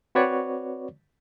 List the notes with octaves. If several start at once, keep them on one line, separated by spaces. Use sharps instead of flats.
C4 F#4 B4 C#5 D5